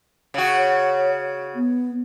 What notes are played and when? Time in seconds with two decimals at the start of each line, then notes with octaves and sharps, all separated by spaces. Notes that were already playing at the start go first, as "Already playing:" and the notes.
0.34 C#3 F#4
0.57 C#5
1.55 B3